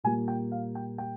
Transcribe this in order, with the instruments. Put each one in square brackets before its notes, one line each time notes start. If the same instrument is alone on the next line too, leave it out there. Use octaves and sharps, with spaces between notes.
[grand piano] A#2 G3 A#3 G#5
G5
F5
G5
G5